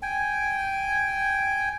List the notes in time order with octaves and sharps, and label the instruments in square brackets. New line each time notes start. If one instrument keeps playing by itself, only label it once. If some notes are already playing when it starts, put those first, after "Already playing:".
[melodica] G5 G#5